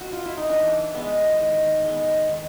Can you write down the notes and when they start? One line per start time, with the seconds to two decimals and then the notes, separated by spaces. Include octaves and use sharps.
0.01 F#4
0.13 F4
0.26 E4
0.38 D#4
0.49 E3 D4
0.95 G#3 B3
1.40 D#3
1.84 G#3 B3
2.29 D#3